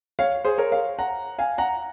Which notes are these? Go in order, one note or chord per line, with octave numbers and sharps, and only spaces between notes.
C#5 F5
G#4 C5
A#4 C#5
C#5 F5
F#5 A#5
F5 G#5
F#5 A#5